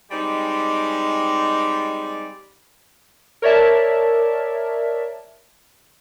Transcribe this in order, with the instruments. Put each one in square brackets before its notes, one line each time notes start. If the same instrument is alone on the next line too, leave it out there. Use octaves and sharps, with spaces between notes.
[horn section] G3 G#3 C4 D#4 G4
[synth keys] A#4 C#5 D5 E5 A5